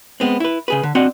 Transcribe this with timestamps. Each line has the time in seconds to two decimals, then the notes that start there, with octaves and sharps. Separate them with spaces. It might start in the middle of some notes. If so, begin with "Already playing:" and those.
0.20 G#3 B3 C4
0.40 E4 B4
0.68 C#3 G#4 B4
0.83 D3
0.95 C4 D4 F#4 D#5 F#5